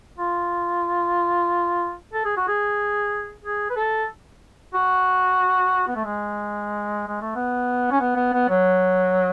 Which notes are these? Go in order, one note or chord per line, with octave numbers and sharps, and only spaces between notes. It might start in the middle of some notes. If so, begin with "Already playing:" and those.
F4
A4
G#4
F#4
G#4
G#4
B4
A4
F#4
B3
A3
G#3
G#3
A3
B3
C#4
B3
B3
B3
F#3